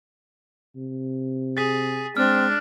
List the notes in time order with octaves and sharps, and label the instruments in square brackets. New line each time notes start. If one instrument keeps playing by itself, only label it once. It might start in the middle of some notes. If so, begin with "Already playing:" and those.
[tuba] C3
[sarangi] G#4 [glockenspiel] A6 B6
[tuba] G#3 [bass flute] C4 [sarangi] D4 [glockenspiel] F6